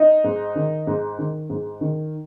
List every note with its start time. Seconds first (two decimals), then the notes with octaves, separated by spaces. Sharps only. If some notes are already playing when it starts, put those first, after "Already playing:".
Already playing: D#4
0.24 G#2
0.55 D#3
0.87 G#2
1.18 D#3
1.50 G#2
1.81 D#3